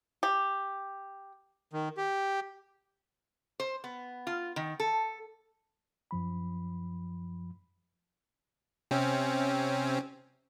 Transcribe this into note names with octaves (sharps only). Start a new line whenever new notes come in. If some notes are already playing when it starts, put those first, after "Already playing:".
G4
D#3
G4
C5
B3
F4
D#3
A4
F#2 F3 B5
C3 C4 C#4